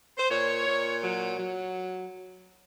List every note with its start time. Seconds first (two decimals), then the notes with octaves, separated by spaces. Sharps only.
0.18 C5
0.30 A#2 C#5
0.66 A#2
1.02 F#3
1.38 F#3